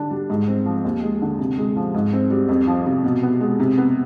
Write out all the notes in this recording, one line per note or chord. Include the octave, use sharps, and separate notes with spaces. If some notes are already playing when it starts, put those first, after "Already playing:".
Already playing: D3 G3 D4
G3
G#2
C4
F3
D#2
G#3
D3
C3
G#3
F3
G#2
C4
G3
F2
F3
C3
B2
B3
G#3
C3
B3